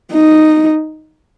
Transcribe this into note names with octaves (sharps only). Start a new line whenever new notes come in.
D#4